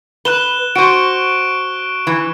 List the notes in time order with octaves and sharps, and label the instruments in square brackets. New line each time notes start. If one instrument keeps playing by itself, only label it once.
[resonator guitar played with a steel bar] B4 [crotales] F#6 E7 G7
[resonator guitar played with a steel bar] F#4 C5 [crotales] C#6 D7
[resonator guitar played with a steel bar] E3